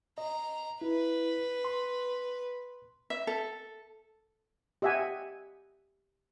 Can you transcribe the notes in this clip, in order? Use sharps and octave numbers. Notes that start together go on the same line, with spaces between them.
D#5 A#5
E4 B4
C6
E5
A4
G4 D#5 E5 F#5 G#5